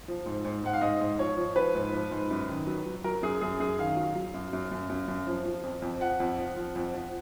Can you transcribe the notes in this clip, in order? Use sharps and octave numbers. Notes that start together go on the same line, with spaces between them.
F3
G#2
G#2
G#2 F#5
F5
G#2 D#5
G#2
F3 C#5
F3
F3 B4
G#2
F3
G#2
F#2
D#3
F#3
F#3
F#3 A#4
F#2 G#4
F#2 G#4
F#2 G#4
D#3 F5
F#3
F#3
F#2
F#2
F#2
F#2
F#2
F3
F3
F2
F2
F3 F#5
F2
F3
F3
F2
F3